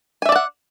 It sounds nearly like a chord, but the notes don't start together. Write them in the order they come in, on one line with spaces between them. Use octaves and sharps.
G#5 E5 D5 A5 F#5